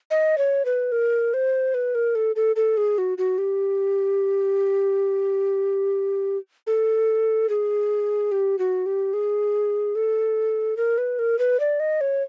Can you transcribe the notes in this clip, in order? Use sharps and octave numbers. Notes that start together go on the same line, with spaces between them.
D#5
C#5
B4
A#4
C5
B4
A#4
A4
A4
A4
G#4
F#4
F#4
G4
A4
G#4
G4
F#4
G4
G#4
A4
A#4
B4
A#4
B4
D5
D#5
C#5